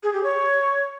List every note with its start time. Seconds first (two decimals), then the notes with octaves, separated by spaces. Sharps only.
0.03 G#4
0.13 G4
0.23 C#5